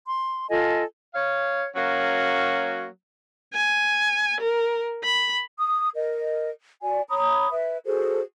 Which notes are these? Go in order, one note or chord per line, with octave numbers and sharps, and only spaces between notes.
C6
F4 A4 D#5 G#5
C#5 F5
F#3 A#3 C#4 F#4
G#5
A#4
B5
D#6
A#4 D#5
F#4 D5 G#5
C#5 A#5 B5 D#6
B4 E5
F#4 G#4 A4 C5